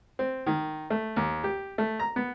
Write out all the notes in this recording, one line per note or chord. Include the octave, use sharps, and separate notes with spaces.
C4
D#3
A3
D#2
G4
A3
A#5
B3